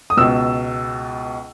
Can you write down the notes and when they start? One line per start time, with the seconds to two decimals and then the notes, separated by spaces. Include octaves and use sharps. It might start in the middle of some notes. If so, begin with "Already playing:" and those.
0.10 D#6
0.17 C#2 B2 E6